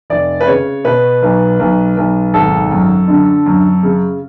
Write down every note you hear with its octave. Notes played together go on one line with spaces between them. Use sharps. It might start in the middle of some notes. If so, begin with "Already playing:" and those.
F1 D5
B4
C#3 C#5
B2 B4
B1
B1
B1
G#1 A4
F#2
D3
F#2
C#3